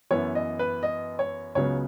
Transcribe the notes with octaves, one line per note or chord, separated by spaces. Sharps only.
F#2 E3 B3 C#5
D#5
B4
D#5
C#5
C#2 C#3 F#3 B3 C#5